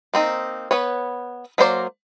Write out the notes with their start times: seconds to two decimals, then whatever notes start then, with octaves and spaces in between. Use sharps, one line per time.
0.14 A#3 C4 D#4
0.71 B3 B4 C#5
1.58 F#3 A#3 A#4 C5 D5